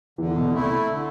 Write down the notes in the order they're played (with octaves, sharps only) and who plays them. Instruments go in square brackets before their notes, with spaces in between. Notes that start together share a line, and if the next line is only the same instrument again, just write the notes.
[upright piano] E2 E3 [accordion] D3
[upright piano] B2
[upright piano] C2 C3 [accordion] A3 E4
[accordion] D3